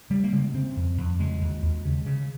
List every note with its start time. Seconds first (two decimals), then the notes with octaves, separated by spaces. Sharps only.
0.10 C#3 G3
0.24 A#3
0.32 C#3 G#3
0.54 C#3 C4
0.76 F2
0.98 F2
1.19 C#3 G#3
1.41 D#2
1.63 D#2
1.85 C#3
2.06 C#3